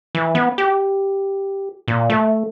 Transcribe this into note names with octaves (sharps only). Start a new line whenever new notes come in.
E3
B3
G4
A#2
A3